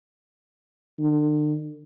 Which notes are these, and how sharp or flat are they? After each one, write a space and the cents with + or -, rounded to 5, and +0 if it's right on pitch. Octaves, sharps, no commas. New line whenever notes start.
D3 +40